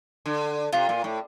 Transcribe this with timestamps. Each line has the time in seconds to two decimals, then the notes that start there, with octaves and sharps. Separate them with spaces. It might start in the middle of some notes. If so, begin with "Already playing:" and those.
0.26 D3
0.73 C3 F4
0.89 A#2
1.04 A2